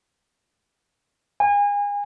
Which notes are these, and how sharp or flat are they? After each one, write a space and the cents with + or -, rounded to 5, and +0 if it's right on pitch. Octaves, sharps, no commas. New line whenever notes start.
G#5 -30